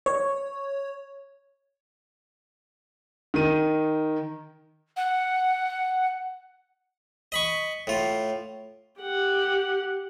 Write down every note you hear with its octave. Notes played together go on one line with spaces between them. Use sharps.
C#5
D#3 D#7
F#5
D#5 B5 C#6
A2 F4
G4 F#5